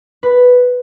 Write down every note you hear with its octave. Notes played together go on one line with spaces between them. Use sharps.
B4